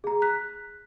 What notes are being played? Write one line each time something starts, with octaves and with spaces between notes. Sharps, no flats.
G#4 A#5
F#6 B6